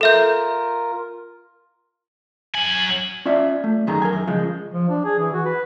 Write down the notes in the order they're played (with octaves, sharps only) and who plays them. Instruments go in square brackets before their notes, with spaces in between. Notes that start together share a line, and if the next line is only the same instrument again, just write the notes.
[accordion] F4 A#4 [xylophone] A4 E5 G6
[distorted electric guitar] F#3 G#5 [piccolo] F#7
[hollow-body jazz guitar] C#4 F4 D5 E5
A3
F#2 D#3 G#4 A#5
A#4 G#5
F#2
C#3 F3 G#3
[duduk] F3
D4
G#4
E3
F#4
B4